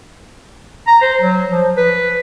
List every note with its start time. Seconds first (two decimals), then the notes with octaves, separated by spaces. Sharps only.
0.87 A#5
1.02 C5
1.21 F#3
1.50 F3
1.77 B4